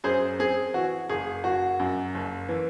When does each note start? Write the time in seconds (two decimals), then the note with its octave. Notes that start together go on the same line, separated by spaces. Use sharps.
0.04 F#2 G#4 C5
0.39 C4 G#4
0.74 E3 F#4
1.09 F#1 G#4
1.44 F#1 F#4
1.79 F#2
2.15 F#1
2.49 E3